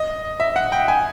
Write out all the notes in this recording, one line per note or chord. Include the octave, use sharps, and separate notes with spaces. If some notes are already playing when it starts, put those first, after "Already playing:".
Already playing: D#5
E5
F#5
G5
G#5